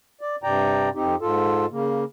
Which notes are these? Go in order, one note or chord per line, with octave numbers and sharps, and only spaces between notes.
D5
G2 C3 D5 G5 A#5
F2 C4 D#4 G4
G#2 F4 A4
C#3 A#3